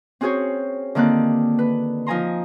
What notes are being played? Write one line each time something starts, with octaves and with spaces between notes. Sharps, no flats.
C4 C#4 F#4 G#4 C5 C#5
D3 D#3 A#3 C4 D5 F#6
B4
F3 D#4 G#5 A#5 C6